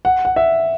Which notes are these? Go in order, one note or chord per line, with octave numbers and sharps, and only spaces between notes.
F#5
F#5
E5